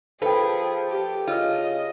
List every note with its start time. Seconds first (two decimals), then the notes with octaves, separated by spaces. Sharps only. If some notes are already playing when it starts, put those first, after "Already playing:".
0.22 F3 G#4 A4 B4 G5
0.90 G4
1.27 C#3 F4 D#5